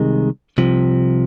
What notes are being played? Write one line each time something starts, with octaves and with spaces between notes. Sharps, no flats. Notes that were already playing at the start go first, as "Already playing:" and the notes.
Already playing: C2 C3 D#3 G#3
C2 C3 F3